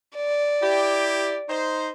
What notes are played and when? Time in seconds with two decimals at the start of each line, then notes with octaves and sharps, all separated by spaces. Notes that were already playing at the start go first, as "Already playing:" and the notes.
0.17 D5
0.63 E4 G4
1.49 D#4 C5